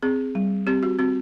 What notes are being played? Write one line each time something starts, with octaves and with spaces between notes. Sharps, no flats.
C4 G#4
G3
C4 G4
F#4
C4 F#4